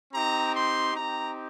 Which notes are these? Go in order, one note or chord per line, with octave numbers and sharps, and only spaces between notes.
C4 D#4 G4 A#5
C6
C4 D#4 G4 A#5